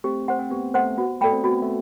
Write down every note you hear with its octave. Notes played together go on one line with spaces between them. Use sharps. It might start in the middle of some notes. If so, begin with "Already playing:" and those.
A3 C4 G4
C5 F#5 C6
C4
B3 G4
A3 C5 F#5 C6
B3 F#4
A3 A4 D5 G5 B5
C4
B3 F#4
A3